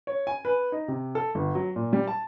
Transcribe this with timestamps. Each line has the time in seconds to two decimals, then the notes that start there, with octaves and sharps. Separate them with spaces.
0.07 C#5
0.27 G#5
0.45 B4
0.72 D#4
0.88 C3
1.15 A4
1.35 G1
1.55 F#3
1.76 A#2
1.93 G3
2.07 A5